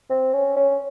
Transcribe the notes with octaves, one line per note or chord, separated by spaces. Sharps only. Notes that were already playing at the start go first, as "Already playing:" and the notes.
C4
C#4
C#4